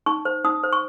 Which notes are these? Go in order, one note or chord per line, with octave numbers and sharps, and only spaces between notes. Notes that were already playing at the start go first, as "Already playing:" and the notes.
D#4 C#6
C5
D#4 D#6
C5
C#6